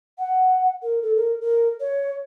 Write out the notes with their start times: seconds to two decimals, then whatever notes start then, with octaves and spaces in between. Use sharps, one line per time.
0.19 F#5
0.83 A#4
1.02 A4
1.16 A#4
1.41 A#4
1.80 C#5